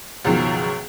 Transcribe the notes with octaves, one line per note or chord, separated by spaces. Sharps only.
C#2 F#2 B2 D#3 F3 G#3